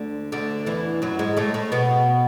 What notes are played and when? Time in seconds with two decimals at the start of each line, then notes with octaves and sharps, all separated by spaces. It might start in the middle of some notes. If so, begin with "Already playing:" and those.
Already playing: D2 D3
0.32 D2 D3
0.66 E2 E3
1.02 F#2 F#3
1.19 G#2 G#3
1.37 A2 A3
1.54 A2 A3
1.72 B2 B3